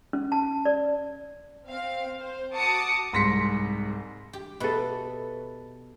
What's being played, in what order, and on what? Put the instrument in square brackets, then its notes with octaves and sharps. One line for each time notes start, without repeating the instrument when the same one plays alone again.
[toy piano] C#4
A5
D5
[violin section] C4 F5
C5
F#4 A5 D6 D#6 C#7
[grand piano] C2 G#2 C6 A#6 B6 C#7
[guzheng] G4
[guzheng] B2 E5 [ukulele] A4 B4